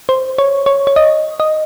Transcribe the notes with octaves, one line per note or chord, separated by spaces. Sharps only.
C5
C#5
C#5
C#5
D#5
D#5